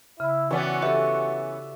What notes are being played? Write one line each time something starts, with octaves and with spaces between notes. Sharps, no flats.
C#3 E4
E3 B3 C#4 F#4 D5 G5 C#6
G4 A4 E5